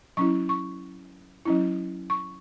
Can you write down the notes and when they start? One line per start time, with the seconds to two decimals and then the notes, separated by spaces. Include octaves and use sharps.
0.17 F#3 C#4 E4 C#6
0.49 C#6
1.45 F#3 C#4 E4
2.10 C#6